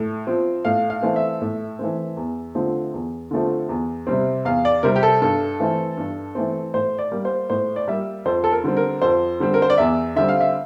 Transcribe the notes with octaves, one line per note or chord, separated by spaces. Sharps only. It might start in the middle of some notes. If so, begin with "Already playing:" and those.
Already playing: A2
F3 C4
A2 F5
F5
E3 A3 C4
E5
A2
E3 A3 C4
E2
D3 F3 A3 C4
E2
D3 F3 A3 C4
E2
C3 G3 C4
E2 F5
D5
C3 G3 C4 A#4
G4
A4
G2 A4
E3 A3 C4
G2
E3 A3 C4
A2 C5
D5
G3 A#3
C5
A2 C5
D5
G3 A#3 E5
F2 C5
A4
A#4
D3 G3 C4
A#4
F2 C5
D3 G3 C4
A#4
C5
D5
E2 E5
D3 G3 C4 E5
F5
E5